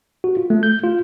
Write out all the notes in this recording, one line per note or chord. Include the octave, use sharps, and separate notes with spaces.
F#4
F4
A3
G6
F4